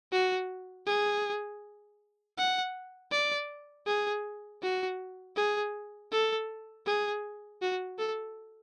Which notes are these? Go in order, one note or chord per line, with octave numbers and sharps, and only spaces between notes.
F#4
G#4
F#5
D5
G#4
F#4
G#4
A4
G#4
F#4
A4